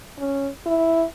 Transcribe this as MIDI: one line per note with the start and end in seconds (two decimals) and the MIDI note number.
0.19 0.48 61
0.66 1.04 64